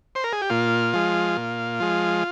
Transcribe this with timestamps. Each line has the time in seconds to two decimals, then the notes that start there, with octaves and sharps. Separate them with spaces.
0.15 C5
0.24 A#4
0.33 G#4
0.42 G4
0.50 A#2 F4
0.93 F3 G#3
1.37 A#2
1.80 F3 G#3